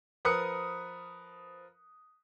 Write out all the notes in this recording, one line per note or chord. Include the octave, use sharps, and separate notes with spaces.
F3 A#4 B4 D#6 F#6 C#7